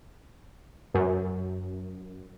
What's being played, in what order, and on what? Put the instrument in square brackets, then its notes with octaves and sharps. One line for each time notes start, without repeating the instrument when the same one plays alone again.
[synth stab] F#2